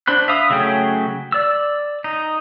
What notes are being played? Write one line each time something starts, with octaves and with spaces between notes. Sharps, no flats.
D4 C5 B5 F#6
E5 F5 D#6
C#3 F#3 A3 G#4 G5
D5 E6
D#4